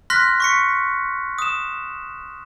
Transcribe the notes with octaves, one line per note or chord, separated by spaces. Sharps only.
C6 F6 F#6 A#6 B6
C#6 B6 C#7
D#6 E7